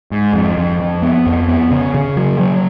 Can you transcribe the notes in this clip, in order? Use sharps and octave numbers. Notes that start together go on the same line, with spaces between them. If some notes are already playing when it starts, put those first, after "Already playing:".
G#2
F2
F2
F2
B3
F2
B3
C#3
C#3
F#3
F#3